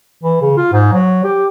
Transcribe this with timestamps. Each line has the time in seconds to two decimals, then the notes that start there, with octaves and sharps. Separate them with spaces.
0.23 E3
0.41 C#3
0.57 F4
0.72 G#2
0.92 F#3
1.24 G4